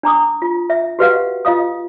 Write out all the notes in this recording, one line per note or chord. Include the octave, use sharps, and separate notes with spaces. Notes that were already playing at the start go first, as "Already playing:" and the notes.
D4 A#5 D6 D#6
F4
E5
F#4 G4 B4 D#5 F5 F#5
F4 D#5 F5 D#6